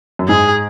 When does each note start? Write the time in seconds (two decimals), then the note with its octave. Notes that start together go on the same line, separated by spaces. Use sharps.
0.19 F#2
0.28 G#2 G#4